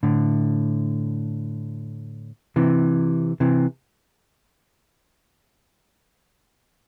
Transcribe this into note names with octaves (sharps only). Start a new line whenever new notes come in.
A2 D3
C3 E3
C3 E3